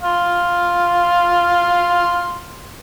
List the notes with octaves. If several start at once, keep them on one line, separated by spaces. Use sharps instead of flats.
F5 C6